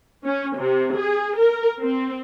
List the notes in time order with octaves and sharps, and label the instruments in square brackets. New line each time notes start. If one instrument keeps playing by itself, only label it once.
[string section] C#4
C3
G#4
A#4
C4